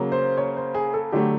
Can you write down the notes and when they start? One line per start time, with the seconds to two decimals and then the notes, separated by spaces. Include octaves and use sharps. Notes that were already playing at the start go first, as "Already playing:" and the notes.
Already playing: C#3 F#3 A#3
0.12 C5
0.37 C#5
0.57 C5
0.75 G#4
0.94 A4
1.12 D3 F#3 A3 G4